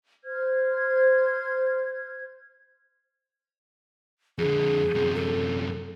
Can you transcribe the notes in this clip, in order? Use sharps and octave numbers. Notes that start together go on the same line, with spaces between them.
C5 F6 G#6
F2 D3 G#4
F#2 C3
A4